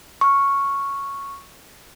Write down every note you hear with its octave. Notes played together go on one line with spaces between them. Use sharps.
C#6 F6